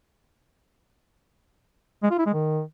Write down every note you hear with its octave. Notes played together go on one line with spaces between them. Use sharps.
G#3
F4
E4
G#3
D#3